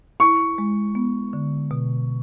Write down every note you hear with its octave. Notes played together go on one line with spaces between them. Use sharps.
E4 C#6
G#3
B3
D3
B2